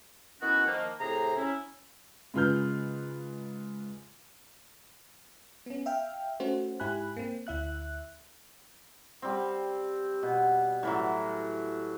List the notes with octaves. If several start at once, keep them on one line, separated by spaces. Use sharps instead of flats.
D#3 B3 C#4 E4 F#4
D#3 F3 A#3
A2 C3 G#4 C5 A#5
C#4 E4
G#2 C#3 F4 B4 F6 G6
B3 C#4
E5 F5 G5 F6
A3 C#4 F#4 C5
G#2 E4 G4 G#5 B5 F#6
A#3 C4
D2 E4 E5 F#6
G3 C4
B2
A2 E3 F#3